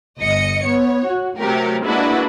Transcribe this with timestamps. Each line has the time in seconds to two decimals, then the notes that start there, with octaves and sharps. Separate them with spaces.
0.19 G1 D#5 C#7
0.66 B3 C#5
1.06 F#4
1.39 C3 F#3 A3 G4 A#4
1.84 G#3 A#3 D4 E4 F#4 B4